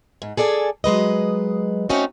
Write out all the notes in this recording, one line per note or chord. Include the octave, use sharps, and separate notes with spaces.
G#2
G#4 A4 D5 F5 G#5
F#3 G#3 B4 D#5
A3 C4 C#4 D#4 F#4 F#5